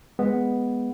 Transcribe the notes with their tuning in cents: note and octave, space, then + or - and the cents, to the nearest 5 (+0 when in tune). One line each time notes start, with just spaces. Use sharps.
G#3 +0 B3 +0